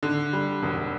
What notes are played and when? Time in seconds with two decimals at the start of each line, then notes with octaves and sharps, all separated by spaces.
0.03 D3
0.33 G3
0.63 E1